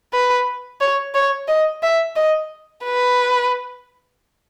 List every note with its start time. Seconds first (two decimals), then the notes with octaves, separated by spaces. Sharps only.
0.13 B4
0.81 C#5
1.15 C#5
1.48 D#5
1.83 E5
2.16 D#5
2.84 B4